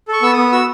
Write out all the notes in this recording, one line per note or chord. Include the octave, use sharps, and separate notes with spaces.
A4
C#6
B3 E6
D#6
B3
F#4 E6